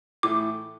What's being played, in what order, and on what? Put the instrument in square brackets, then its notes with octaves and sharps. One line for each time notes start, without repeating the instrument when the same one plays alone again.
[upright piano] A2 E3 A3 [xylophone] D6